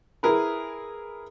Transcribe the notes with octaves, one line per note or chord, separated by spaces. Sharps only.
E4 G#4 A#4 B4